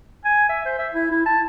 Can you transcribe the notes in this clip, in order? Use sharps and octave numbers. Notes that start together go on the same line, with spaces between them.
G#5
E5
C5
E5
E4
E4
A5